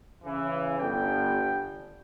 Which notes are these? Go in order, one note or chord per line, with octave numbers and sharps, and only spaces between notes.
C#3 E3
G1 D3 G3 G5